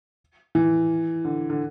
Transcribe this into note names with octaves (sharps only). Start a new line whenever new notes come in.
E3
D3
D3